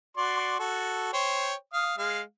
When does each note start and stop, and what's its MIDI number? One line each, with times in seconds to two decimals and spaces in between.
0.17 0.57 66
0.17 0.57 74
0.17 0.57 84
0.59 1.09 66
0.59 1.09 69
1.13 1.54 72
1.13 1.54 73
1.13 1.54 79
1.73 1.94 77
1.73 1.94 87
1.98 2.21 56
1.98 2.21 77